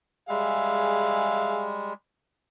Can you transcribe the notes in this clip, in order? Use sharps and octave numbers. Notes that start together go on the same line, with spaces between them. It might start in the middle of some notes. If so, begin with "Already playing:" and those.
G3 G#3 G#4 E5 F5